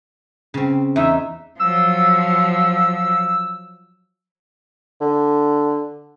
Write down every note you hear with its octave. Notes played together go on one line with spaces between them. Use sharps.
C#3 C4
E2 D#4 E5
F3 F#3 E6
D3